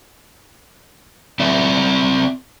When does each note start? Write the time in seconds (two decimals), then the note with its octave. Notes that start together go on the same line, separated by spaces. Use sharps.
1.40 C4 D5 E5